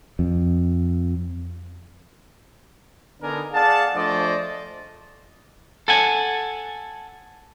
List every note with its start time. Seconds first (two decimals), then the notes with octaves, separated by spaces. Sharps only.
0.19 F2
3.21 D3 B3 D4 D#4 A#4 G#5
3.53 G#4 D5 F5 F#5 A5
3.95 F3 A3 D4 C5 D5 D#5
5.88 A4 F#5 G#5